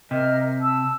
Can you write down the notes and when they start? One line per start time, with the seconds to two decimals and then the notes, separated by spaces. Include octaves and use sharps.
0.11 C3 A#4 D#5 F6
0.59 A5 E6